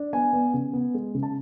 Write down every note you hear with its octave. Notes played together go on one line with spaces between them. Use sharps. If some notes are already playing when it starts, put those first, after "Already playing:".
Already playing: D4
B3 G#5
B3
C#3
B3
G#3
C#3
A5